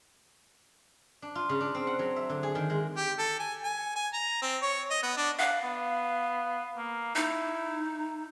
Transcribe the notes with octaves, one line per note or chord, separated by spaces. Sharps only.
D4
F4
C#3
D4
C4
F#5
F#3
E5
D3
G#4
D#3
G#3
G4
A4
G#5
G#5
G#5
A#5
C4
C#5
D#5
B3
D4
F5 F#5
B3
A#3
D#4 E4